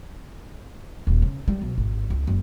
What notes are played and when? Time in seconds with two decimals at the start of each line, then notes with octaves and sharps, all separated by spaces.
1.07 D#1
1.22 C#3
1.48 G3
1.61 B1
1.77 G#1
2.10 C#2
2.27 F#1